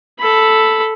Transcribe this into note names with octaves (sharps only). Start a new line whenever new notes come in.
A4 B5